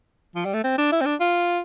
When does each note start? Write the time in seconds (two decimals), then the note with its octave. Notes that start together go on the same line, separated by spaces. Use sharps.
0.35 F3
0.45 G3
0.54 A3
0.64 C4
0.78 D4
0.92 E4
1.01 C4
1.06 D4
1.20 F4